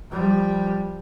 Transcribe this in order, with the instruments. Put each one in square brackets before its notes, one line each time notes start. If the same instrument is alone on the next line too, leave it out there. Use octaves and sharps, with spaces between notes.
[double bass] F3 G3